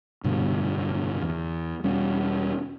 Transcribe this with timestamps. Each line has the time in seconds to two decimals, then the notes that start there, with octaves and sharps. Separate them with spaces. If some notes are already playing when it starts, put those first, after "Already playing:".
0.24 F1 G2 B2 D3
1.21 E2
1.83 E1 G3 C#4